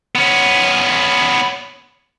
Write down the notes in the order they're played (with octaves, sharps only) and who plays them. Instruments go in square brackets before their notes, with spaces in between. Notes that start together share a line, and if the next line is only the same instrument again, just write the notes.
[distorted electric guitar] B3 C#4